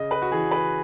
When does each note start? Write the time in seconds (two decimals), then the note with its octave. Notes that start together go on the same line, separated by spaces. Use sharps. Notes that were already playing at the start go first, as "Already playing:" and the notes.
Already playing: C#3 D#5
0.11 B4
0.22 F#4
0.31 E3 G#4
0.51 B4